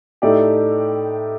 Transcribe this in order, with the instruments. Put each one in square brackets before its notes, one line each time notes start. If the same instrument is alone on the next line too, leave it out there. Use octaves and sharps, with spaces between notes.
[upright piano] A2 A3 D#4 G4 D5